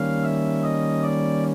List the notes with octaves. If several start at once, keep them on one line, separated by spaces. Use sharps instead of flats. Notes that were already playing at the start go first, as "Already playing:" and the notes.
Already playing: D#3 G3 A#3 C#4 F5
E5
D#5
D5